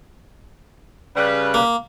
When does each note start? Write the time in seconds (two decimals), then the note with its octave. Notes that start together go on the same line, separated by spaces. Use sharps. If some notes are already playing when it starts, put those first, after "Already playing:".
1.16 C#3 G3 B4
1.54 A#3